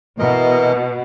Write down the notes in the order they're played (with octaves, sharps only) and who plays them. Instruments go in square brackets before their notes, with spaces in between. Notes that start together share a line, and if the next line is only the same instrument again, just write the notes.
[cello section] B2 [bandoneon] E3 A#4 D#5